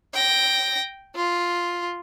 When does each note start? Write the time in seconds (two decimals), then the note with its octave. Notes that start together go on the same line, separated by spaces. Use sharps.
0.14 G5 A#6
1.16 F4